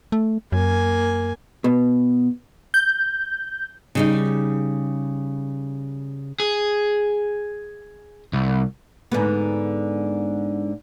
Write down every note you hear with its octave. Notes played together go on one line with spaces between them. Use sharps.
A3
F#2 A#3 G#5
B2
G6
C#3 G3 D#4
G#4
C2
G#2 D3 B3